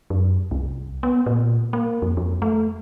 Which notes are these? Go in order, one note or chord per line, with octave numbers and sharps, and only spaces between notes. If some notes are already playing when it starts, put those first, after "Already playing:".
F#2
C2
B3
A#2
A#3
F2
F2
A3